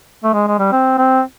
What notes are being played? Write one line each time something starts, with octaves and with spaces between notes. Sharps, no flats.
A3
G#3
G#3
G3
C4
C4